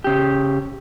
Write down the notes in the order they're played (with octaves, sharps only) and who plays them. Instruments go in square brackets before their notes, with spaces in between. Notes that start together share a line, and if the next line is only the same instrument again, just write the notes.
[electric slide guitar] C#3 G4